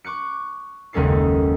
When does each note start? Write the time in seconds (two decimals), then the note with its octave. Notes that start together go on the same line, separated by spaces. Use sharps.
0.04 C#6 D6 F#6 C#7
0.93 F#1 D#2 G#3 C#4 A4 C7